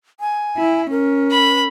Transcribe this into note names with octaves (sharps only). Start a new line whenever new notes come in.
G#5
E4
C#4 A#4
B5